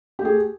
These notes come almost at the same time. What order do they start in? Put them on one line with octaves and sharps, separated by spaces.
G4 A3 G#4